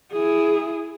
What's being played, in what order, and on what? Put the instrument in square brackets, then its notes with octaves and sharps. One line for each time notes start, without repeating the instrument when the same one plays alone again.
[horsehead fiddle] E4 G#4